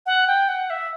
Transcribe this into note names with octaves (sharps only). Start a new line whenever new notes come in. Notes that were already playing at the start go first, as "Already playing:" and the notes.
F#5
G5
F#5
E5